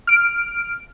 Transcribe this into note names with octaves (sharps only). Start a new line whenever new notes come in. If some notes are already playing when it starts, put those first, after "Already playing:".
F6 D7